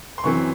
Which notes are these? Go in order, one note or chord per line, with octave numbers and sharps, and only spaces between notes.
C6
F#2 E3 C4 C#6